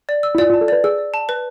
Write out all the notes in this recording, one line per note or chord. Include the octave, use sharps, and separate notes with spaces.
D5
E6
E4
F4 D5
F4
A5
A4
B4 D5
G#4 E6
D5
A5
B4